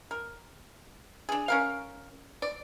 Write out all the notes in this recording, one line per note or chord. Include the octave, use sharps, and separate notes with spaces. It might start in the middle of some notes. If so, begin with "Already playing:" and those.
A#4
D4 G#4
C#4 A#4 F5
D5